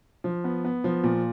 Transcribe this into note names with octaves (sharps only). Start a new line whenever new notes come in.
F3
B3
B3
F3
A#2